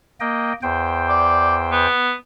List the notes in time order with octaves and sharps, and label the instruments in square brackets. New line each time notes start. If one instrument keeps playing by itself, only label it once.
[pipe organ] A#3 D#5 G5
E2 C5 G5
[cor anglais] D5
B3